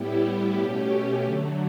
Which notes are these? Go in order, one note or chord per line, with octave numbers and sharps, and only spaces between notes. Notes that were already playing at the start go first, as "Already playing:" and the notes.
Already playing: A2 G3 B3 E4 G4
G4
B2 A3 C#4
D3 F#3 A3